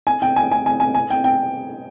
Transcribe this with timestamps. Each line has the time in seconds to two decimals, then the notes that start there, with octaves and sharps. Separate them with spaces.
0.07 G#5
0.22 G5
0.36 G#5
0.51 G#5
0.66 G#5
0.80 G#5
0.95 G#5
1.10 G5
1.24 G5